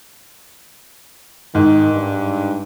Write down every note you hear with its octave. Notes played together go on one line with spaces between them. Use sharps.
G#2 D#3
G2